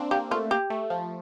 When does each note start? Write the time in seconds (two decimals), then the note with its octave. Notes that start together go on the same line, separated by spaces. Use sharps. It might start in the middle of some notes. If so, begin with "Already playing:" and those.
Already playing: A#3 C4 D4
0.11 A#3 G4
0.31 A3 F4
0.51 A#3 G4
0.70 A3
0.90 F3